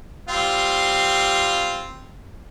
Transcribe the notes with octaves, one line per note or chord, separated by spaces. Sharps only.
G3 C4 F4